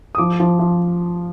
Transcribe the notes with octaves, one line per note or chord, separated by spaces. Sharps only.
D#6
F3 D6
F3
F3